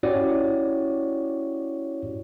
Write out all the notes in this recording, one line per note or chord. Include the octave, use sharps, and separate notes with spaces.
C#4 E4 F#4 G4 C#5 D5